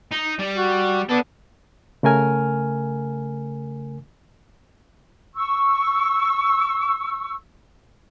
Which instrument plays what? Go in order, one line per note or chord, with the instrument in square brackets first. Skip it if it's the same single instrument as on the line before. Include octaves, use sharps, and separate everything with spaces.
[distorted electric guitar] D#4
G3
[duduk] F#4
[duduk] B3 [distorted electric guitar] A4 D5
[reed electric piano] C#3 A3 A#4 G#5 F6
[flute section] C#6 E6